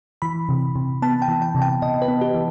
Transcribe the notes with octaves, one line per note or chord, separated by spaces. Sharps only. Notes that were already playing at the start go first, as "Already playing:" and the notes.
E3 B5
C3
C3
B3 A5
G5
E3
G5
C3
G5
C3 D#5
B4
B3
G4
E3